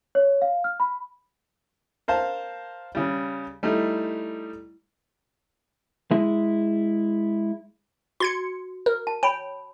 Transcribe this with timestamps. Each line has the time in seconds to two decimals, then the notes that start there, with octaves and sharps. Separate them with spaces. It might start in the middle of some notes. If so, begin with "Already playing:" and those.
0.15 C#5
0.42 F5
0.64 F6
0.80 B5
2.08 A#4 C5 F5 A5
2.95 C#3 G3
3.63 G3 A3 D#4 E4
6.11 G#3 E4
8.20 F#4 C6 G#6 C#7
8.86 A#4
9.07 A5
9.23 C#5 G5 B5